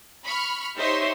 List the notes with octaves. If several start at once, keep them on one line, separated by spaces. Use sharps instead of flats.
B5 C#6 F6
D#4 G4 C5 C#5 E5 C6